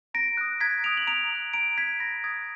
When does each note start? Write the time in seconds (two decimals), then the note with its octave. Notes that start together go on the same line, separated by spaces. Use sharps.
0.14 A#5 A#6 D7
0.37 D#6 F#6
0.60 A#5 G#6 B6
0.84 D#6 F#6 D7 F7
0.97 F#7
1.07 A#5 D7 F7
1.31 D#6 F#6
1.53 A#5 D7 F7
1.78 D#6 F#6 G#6 B6
2.00 B5 A#6
2.24 D#6 F#6 G#6